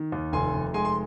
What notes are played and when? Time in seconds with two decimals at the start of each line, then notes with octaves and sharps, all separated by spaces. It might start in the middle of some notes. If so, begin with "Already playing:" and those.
Already playing: D#3
0.12 D#2
0.32 F1 G#5 C6
0.53 F1
0.73 G#3 G#5 C6
0.85 C6